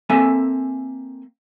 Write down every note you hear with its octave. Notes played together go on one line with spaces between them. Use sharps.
A#3 C4 A4 E5 G#5